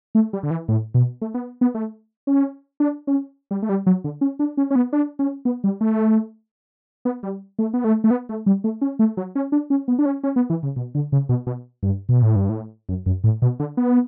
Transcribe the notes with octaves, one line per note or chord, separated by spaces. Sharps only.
A3
G3
D3
E3
A2
B2
A3
B3
B3
A3
C#4
D4
C#4
G3
A3
G3
F#3
D3
C#4
D4
C#4
C#4
B3
D4
C#4
B3
G3
A3
B3
G3
A3
B3
A3
A3
B3
A3
G3
A3
C#4
A3
F#3
C#4
D4
C#4
B3
D4
C#4
C#4
B3
E3
C#3
B2
D3
C#3
B2
B2
G2
B2
A2
G2
A2
F#2
F#2
A2
B2
D3
B3